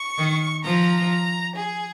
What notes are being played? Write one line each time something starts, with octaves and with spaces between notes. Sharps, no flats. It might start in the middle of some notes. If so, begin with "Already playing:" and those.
Already playing: C#6
D#3
F3 A#5
G#4